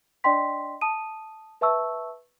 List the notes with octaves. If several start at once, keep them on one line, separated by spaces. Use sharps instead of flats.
D4 D5 D#5 G5 C6 B6
A5 D#6 D#7
B4 E5 A5 C#6 E6